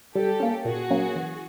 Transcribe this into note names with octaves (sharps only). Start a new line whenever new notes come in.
G3 G4 A4
A#3 C#4
A#2 F#4 G#4
F#3 A#3 C#4
E3